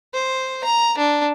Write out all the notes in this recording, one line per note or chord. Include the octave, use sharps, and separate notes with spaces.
C5
A#5
D4